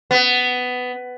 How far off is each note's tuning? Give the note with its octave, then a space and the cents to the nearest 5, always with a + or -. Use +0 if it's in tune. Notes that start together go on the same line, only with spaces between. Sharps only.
B3 +15